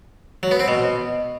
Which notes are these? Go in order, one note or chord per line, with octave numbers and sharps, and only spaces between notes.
F#3
B3
C4
B2